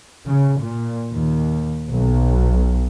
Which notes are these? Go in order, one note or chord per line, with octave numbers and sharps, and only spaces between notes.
C#3
A#2
D#2
B1